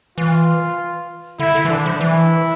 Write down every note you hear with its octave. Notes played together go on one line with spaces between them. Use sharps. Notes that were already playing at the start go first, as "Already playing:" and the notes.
E3 F4
D3 E4
D3
E3
D3 D4
F3
E3 E4